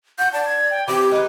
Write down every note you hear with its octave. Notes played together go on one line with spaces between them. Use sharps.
F#5 G6
D5 A5
G#6
G5
E3 C4 G4 D6
G#3 D#4 B4